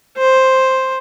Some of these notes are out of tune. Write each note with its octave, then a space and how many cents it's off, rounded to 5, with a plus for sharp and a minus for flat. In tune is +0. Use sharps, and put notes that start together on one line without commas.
C5 +5